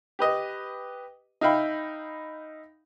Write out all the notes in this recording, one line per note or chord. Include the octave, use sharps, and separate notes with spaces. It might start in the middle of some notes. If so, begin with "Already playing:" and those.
G4 B4 D#5
D#4 E5 F5 G5 B5